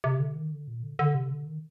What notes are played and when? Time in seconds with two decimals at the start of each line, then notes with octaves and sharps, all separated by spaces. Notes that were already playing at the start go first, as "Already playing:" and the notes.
0.04 C3
0.20 D3
0.36 D#3
0.52 D3
0.68 A#2
0.83 D3
0.99 D3
1.15 C3
1.31 D3
1.46 D#3